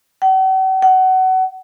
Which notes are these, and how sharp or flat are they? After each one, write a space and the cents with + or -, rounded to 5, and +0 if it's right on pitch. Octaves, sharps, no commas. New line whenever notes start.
F#5 +45
F#5 +25